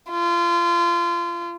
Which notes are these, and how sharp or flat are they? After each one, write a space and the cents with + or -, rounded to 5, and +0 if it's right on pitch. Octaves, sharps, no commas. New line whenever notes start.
F4 -30